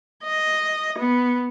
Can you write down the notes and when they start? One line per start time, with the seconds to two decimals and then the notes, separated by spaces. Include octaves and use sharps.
0.24 D#5
0.99 B3